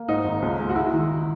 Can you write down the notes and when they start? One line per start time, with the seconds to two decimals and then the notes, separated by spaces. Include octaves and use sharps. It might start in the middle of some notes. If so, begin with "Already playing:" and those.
Already playing: A#3
0.08 G#2 D#4
0.24 G#1
0.42 C#2
0.59 G#3
0.69 F#4
0.76 G#3 E4
0.93 D#3